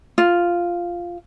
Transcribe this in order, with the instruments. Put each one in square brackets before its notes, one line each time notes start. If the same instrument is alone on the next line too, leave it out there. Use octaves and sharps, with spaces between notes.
[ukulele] F4